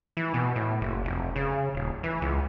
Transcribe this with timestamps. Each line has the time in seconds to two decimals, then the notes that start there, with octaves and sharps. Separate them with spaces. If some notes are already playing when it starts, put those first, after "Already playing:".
0.17 E3
0.34 B2
0.56 A2
0.81 F#1
1.04 F1
1.36 C#3
1.75 D#1
2.03 E3
2.22 C#2